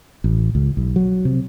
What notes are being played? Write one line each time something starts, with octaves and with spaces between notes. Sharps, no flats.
A1
C#2
B1
F#3
C3